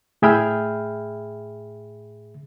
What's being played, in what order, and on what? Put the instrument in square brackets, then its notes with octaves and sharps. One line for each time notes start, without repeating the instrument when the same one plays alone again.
[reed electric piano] A2 G#4 E5 G5 B5 F6